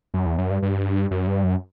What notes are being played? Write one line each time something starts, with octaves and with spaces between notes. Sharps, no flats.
F#2
E2
F#2
G2
G2
F#2
G2
F#2